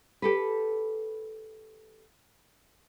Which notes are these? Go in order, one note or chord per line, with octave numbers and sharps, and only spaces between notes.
G4 A4 B4